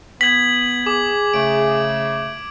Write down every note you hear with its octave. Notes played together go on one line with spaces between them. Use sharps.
B3 G#6 B6 F#7
G#4 D6
C#3 A3 D7